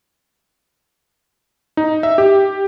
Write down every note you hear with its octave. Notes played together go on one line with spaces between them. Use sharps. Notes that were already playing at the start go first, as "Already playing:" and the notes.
D#4
E5
G4